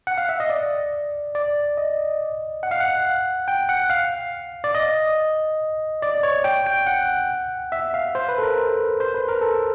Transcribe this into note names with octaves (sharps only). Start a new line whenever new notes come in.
F#5
F5
E5
D#5
D5
D5
D#5
F#5
F5
F#5
G5
F#5
F5
D5
D#5
D5
C#5
G5
G5
F#5
E5
F5
C5
B4
A4
A#4
C5
B4
A#4
A4